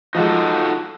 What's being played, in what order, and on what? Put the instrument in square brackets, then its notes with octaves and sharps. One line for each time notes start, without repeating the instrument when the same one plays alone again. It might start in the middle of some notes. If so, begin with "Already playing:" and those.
[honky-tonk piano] F3 G#3 [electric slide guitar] D#4 F#4 A4